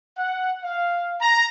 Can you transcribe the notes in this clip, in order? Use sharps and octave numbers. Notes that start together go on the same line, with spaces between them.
F#5
F5
A#5